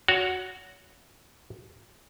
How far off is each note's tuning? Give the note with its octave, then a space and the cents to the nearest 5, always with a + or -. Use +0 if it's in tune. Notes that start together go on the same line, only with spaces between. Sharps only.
F#4 +0 C#5 +30